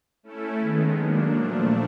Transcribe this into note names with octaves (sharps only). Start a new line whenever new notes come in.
A3 C#4 E4 A4
D#3 G#3 B3
F#3 A#3 D4
A#2 F3 A3 D4